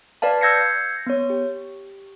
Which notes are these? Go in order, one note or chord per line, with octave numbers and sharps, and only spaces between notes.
B4 D5 F5 A5
E6 G6 G#6 A#6 C7 C#7
B3 C#5
G4